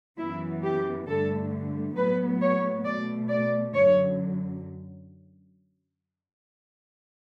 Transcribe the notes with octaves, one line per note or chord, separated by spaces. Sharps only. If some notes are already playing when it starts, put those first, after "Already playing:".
F#2 E3 B3 E4
G4
G2 D3 A3 A4
A2 F#3 B3 B4
C#5
B2 A3 D5
D5
F#2 D3 F#3 C#5